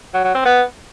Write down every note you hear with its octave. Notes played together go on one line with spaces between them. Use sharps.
F#3
F#3
C4
B3